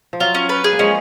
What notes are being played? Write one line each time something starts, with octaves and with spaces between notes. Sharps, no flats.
F3
F#3 F4
C#4
B4
G#4
A#3
F3 G#3 C#4